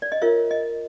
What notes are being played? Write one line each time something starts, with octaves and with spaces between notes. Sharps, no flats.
D5
D#5
F4 A#4 C#5 E5
D#5